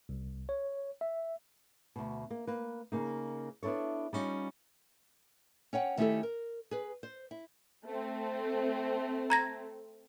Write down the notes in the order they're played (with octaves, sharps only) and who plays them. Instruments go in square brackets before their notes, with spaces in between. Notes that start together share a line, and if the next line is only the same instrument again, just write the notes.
[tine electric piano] C2
C#5
E5
[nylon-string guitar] D2 B2
A#3
A#3 B4
C#3 A#3 D#4
B3 D4 E4 A4 C#5
G3 C#4 D#4 F4
C#4 C#5 F#5 G5
D#3 A3 C#4 E4 G4 A4
A#4
G#4 B4
C5
E4
[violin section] A3 C4
[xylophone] A#5 G#6 A#6